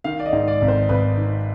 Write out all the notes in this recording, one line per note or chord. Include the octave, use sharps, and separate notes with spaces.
D#3 F5
D5
D#5
G#2
D5
G#1
C5
G#1 B4
D#3